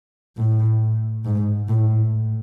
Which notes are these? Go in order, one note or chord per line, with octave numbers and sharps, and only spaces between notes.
A2
G#2
A2